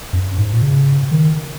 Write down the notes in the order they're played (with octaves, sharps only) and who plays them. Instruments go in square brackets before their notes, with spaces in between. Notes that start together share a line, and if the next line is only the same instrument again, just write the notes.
[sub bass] F#2
G#2
A#2
C#3
D#3